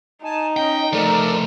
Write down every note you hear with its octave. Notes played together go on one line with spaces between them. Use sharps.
D#4 G#5 A5
C#4 D#5 G5
F3 A3 A4 A#4 D5